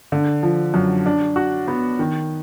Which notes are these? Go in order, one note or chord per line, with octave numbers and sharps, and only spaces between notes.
D3
F3
F#2
D4
F#4
B3
D#3